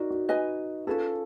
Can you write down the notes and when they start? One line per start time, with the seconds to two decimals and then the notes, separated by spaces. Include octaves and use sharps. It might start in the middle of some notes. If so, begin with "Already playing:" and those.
Already playing: D#4 F#4 A#4 D5
0.11 F#4
0.29 B4 D#5 G#5
0.87 C#4 F4 G#4 A4 B4